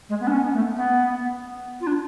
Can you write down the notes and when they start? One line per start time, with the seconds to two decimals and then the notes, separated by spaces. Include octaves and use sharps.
0.09 G#3
0.20 B3
0.27 D4
0.31 C#4
0.42 B3
0.54 A3
0.76 B3
1.80 F4
1.87 D4